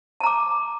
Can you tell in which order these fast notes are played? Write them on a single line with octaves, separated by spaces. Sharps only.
A5 A#5 D6